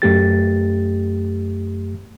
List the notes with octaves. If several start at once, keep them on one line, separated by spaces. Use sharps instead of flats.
F#2 A3 G4 A6